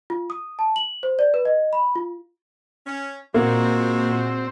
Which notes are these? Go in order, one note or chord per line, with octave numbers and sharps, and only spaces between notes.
F4
D#6
A5
F#7
C5
D5
B4
D#5
B5
F4
C#4
A#2 G#3 A#3 C4 F#4